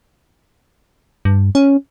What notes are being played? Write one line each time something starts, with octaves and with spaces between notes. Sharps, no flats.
G2
C#4